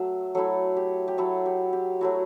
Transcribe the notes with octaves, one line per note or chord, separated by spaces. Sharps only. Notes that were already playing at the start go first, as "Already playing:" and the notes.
Already playing: F#3 A3 E5
F#3 A3 E4 A4
G4
G4
F#3 A3 E4 A4
G4
G4
F#3 A3 E4 F#4